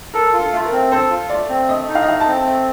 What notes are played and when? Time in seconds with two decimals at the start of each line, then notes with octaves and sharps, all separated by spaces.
0.14 A4 A#4
0.33 F4
0.40 A4
0.53 A3
0.65 A#4
0.72 C4
0.91 A4 C5
1.10 F4
1.30 A3 D5
1.49 C4
1.69 A3 D#5
1.88 D#4
1.95 F5
2.02 D#5
2.08 A3 F5
2.20 A5
2.27 C4
2.46 A3